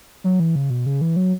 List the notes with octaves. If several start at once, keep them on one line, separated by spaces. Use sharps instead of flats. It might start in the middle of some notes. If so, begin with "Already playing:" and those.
F#3
E3
C#3
B2
C#3
E3
F#3